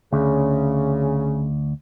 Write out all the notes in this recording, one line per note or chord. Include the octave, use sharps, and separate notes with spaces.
D2 C#3